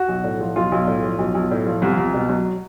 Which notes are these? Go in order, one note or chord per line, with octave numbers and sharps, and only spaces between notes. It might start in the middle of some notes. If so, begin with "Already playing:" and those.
Already playing: F#4
B1
A2
F3
B1 F4
B1
A2
F3
B1
B1
A2
F3
C2
C2
B2
F#3